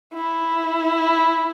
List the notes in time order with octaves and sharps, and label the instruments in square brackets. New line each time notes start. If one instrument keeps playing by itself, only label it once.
[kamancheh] E4